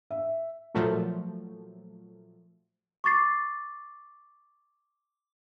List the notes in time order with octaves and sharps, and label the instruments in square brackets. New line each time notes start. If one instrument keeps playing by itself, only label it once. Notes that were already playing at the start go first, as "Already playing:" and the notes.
[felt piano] E5
[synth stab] A#2 F3 F#3 A3
[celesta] C#6 D6 A6 C7